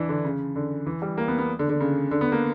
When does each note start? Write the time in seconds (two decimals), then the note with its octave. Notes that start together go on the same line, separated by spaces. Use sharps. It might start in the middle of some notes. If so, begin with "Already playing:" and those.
Already playing: E3 D4 E4
0.09 D3
0.25 C#3
0.56 D3
0.86 E3
1.02 G3
1.18 A#3
1.28 B3
1.38 B3
1.59 D3
1.69 D3
1.80 C#3
2.11 D3
2.21 B3
2.32 A#3